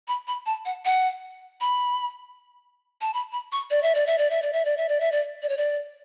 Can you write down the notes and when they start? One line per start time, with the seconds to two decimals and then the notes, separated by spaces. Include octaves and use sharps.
0.08 B5
0.27 B5
0.46 A5
0.65 F#5
0.85 F#5
1.61 B5
3.01 A5
3.14 B5
3.32 B5
3.52 C#6
3.70 D5
3.83 E5
3.95 D5
4.07 E5
4.18 D5
4.30 E5
4.42 D5
4.53 E5
4.65 D5
4.77 E5
4.89 D5
5.00 E5
5.12 D5
5.42 D5
5.49 C#5
5.57 D5